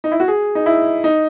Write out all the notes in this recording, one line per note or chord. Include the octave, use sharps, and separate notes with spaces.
D#4
E4
F#4
G#4
D#4
E4
D#4